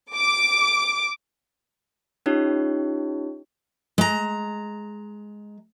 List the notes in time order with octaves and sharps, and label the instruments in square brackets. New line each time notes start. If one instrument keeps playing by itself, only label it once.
[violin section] D6
[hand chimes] C#4 D#4 F4 G4 C#5
[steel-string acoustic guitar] G#3 A#5